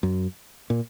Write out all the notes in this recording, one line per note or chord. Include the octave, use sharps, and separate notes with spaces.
F#2
A#2